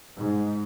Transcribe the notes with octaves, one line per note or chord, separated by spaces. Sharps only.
G#2